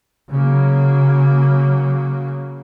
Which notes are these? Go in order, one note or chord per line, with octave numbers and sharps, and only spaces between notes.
C#3 F#3 A#3